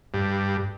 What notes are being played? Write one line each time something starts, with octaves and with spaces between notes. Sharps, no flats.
G2